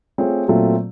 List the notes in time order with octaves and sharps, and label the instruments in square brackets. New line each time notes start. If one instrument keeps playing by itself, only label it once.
[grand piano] A3 C4 F4 G#4 C#5
A#2 F#3 A3 C4 F4